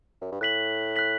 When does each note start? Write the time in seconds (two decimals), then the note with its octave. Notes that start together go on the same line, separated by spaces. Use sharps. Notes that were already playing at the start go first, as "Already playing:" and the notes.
0.21 F#2
0.32 G2
0.41 A2 F#6 B6 F#7
0.96 F#6 B6 F#7